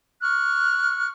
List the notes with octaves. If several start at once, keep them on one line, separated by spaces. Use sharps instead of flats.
C#6 F6 F#6